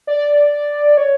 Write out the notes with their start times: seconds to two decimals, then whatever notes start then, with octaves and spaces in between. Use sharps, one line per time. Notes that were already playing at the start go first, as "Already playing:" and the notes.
0.07 D5
0.97 C#5